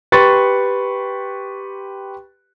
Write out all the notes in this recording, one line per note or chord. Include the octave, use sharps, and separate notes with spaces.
G4 B4 C6 C#6 A6